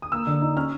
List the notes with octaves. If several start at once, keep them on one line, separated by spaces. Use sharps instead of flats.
D#6
A#3 E6
D3
D#4
C#4 F6